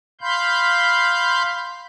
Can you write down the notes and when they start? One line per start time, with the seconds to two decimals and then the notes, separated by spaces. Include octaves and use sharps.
0.21 F5 B5 C6 G6